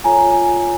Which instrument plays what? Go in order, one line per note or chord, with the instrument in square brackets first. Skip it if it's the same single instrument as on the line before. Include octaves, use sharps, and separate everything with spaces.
[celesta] F4 A4 C#5 G#5 A#5